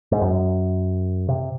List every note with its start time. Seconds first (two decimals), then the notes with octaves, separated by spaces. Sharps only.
0.12 G#2
0.21 F#2
1.28 C3